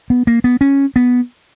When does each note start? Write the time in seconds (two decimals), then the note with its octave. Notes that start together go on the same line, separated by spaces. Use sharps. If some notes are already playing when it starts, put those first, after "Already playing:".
0.10 B3
0.27 A#3
0.44 B3
0.61 C#4
0.96 B3